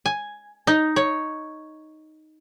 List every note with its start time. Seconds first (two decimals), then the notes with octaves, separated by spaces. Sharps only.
0.06 G#5
0.67 D#4
0.96 C#5